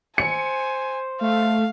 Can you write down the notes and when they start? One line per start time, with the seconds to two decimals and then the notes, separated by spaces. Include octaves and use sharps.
0.18 C5 G#5 C#7
1.21 A3 F5